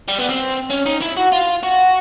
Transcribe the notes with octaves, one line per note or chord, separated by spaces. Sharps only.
G3
B3
C4
C#4
D#4
E4
F#4
F4
F#4